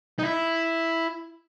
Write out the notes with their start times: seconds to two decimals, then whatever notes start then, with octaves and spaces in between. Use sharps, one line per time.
0.19 D#4
0.23 E4